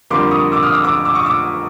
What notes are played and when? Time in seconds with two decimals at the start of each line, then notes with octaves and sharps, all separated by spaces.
0.10 F2 D3 G3 A#3 C6 D6
0.31 C#6 D#6
0.52 D6 E6
0.63 D#6 F6
0.74 D6 E6
0.84 D6 E6
1.05 D6 E6
1.15 C#6 D#6
1.26 D6 E6